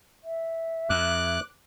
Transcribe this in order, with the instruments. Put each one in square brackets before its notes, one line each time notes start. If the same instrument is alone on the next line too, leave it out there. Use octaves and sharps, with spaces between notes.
[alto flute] E5
[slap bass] F2 [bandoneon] D6 F#6